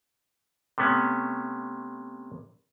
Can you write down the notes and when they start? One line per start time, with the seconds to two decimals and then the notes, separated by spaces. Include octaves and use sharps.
0.78 C3 A3 B3 C#4